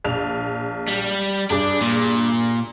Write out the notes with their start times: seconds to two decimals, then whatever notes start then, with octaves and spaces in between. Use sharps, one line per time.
0.04 A#1 F7
0.88 G3
1.50 G2 D4 G#4 D6
1.81 A#2